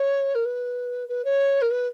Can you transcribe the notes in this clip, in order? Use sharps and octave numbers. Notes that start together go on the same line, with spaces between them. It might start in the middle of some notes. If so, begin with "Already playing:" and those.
Already playing: C#5
A#4
B4
B4
C#5
A#4
B4